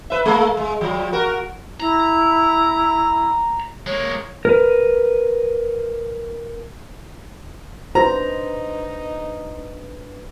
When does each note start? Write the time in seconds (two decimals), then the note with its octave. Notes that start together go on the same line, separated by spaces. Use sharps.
0.10 B4 E5
0.25 G#3 A#3
0.57 G#3
0.81 F3 G3
1.13 F#4 A#4
1.80 E4 A#5
3.87 G#3 A#3 C#5
4.45 A#4 B4
7.95 A1 D4 D#4 B4 C5 A#5